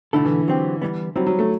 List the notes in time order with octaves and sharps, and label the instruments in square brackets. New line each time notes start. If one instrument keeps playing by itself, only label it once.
[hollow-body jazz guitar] B2 A3 E4 A4 [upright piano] D3
[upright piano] E3
[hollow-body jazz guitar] F#3 C4 G4
E3 G3 B3
[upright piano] F#3 [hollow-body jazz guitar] G3 C4 E4
[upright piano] F#3
A3